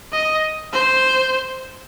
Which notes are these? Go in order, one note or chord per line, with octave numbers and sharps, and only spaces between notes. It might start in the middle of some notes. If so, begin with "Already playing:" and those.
D#5
C5